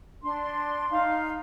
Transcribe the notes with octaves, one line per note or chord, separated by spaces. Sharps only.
D4 C6
D#4 F5